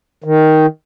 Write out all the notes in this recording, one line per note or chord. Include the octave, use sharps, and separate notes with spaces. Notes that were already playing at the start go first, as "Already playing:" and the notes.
D#3